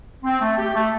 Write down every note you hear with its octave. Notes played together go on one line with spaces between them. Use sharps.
C4
A3
G4
A3